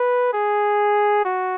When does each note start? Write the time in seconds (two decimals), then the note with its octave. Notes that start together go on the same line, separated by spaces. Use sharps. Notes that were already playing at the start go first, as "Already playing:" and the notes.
Already playing: B4
0.33 G#4
1.25 F#4